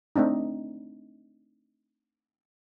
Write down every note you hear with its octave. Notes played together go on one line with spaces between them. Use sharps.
A3 C4 D4 D#4